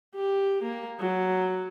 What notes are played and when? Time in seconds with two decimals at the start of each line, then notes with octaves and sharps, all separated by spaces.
0.15 G4
0.62 A#3
1.00 F#3